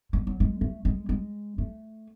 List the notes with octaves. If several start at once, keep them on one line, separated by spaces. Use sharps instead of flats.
G#3
F#3
G#3
A3
G#3
G#3
A3